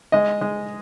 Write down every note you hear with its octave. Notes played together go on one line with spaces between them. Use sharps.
G#3 D#5
G#3